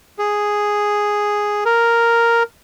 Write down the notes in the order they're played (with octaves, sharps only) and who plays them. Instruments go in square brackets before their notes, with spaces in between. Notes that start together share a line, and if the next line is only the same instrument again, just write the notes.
[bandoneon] G#4
A#4